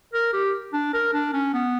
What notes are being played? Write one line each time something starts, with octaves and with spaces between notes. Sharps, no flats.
A#4
G4
D4
A#4
D4
C#4
B3